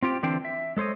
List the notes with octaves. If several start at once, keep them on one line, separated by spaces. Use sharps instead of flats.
C4 F4 G4 G5
D3 E3 C4 D4 C5 G5
E5
G#3 A4 C5 C#5 D#5